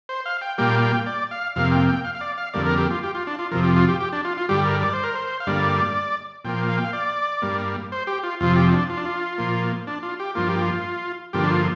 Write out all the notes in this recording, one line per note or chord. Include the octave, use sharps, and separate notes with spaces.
C5
F5
G5
A#2 G3 A#3 G5
G5
D5
F5
F2 C3 A#3 F5
G5
G5
F5
F5
D5
F5
F2 D3 G3 A#3 D5
A#4
G4
F4
G4
F4
D4
F4
F2 C3 F3 A#4
G4
F4
G4
G4
D4
F4
F4
G2 D3 G3 G4
A#4
D5
C5
A#4
C5
F5
G2 D3 G3 A#3 D5
A#2 F3 A#3 G5
F5
G5
F5
D5
G2 G3 A#3
C5
G4
F4
F2 C3 F3 F4
G4
D4
F4
D4
F4
A#2 F3 A#3
D4
F4
G4
G2 F3 A#3 F4
G4
F4
G2 D3 F3 A#3 G4
D4
F4